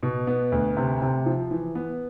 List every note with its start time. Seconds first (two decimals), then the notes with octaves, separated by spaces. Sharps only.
0.03 B2
0.27 B3
0.52 D2
0.77 C3
1.02 C3
1.26 F3
1.51 E3
1.75 B3